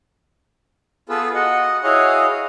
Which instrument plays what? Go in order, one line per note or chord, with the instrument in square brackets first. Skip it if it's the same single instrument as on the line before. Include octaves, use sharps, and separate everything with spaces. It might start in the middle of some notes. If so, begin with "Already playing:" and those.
[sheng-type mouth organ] B3 F4 G#4 A4 B4
F#4 D#5 F#5
E4 F#4 G#4 C#5 D#5 F5